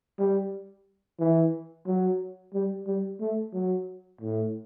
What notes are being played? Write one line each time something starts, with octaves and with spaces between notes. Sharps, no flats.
G3
E3
F#3
G3
G3
A3
F#3
A2